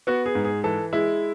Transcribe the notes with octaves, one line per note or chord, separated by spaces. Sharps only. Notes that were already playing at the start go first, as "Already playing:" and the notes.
B3 F#4
G#4
G#2
G#4
E3 A4
G#3 E4